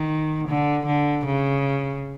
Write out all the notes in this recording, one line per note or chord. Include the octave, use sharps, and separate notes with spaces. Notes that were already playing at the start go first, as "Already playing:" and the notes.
Already playing: D#3
D3
D3
C#3